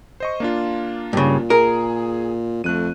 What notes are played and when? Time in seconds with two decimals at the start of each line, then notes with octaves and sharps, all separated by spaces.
0.20 C5 D#5 C#6
0.40 A#3 D4 F4
1.13 G2 A#2 C#3
1.50 G#4 A#4
2.64 F2 A3 F#6 D#7